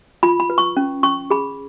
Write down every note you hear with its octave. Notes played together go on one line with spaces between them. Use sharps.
F4 B5
B5
B4
C#6
C#4
C#4 C#6
G#4 B5